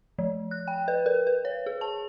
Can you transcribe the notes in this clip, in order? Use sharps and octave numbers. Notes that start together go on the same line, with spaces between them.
F3
F#6
G5
B4
A#4
B4
C#5
G#4
A5